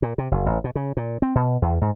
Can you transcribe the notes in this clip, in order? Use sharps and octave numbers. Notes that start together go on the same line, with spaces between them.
A#2
C3
F#1
A1
B2
C#3
A#2
C4
B2
E2
G#2